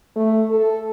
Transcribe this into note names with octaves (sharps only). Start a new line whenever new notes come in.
A3
A4